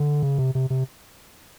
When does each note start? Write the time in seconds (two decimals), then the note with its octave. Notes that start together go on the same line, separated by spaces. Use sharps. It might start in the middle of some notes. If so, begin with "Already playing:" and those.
Already playing: D3
0.23 C#3
0.38 C3
0.55 C3
0.70 C3